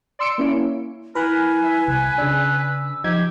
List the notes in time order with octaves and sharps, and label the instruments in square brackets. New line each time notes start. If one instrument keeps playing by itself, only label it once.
[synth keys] D5 C6 E6 C#7 D7
A#3 C#4 E4
[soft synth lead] E4 [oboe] A#4 [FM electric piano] B4 B5 F#6 [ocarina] G#5
[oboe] E5
[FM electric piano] C2 [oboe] B4
[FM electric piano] C#3 D4 [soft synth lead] E6
[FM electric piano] F3 D#4 G#6 [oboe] G4